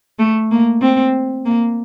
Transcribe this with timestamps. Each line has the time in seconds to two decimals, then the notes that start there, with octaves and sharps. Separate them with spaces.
0.19 A3
0.52 A#3
0.82 C4
1.46 A#3